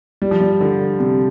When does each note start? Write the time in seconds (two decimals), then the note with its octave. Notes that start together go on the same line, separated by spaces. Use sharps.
0.22 G3
0.31 F3
0.41 G3
0.61 D3
1.00 C3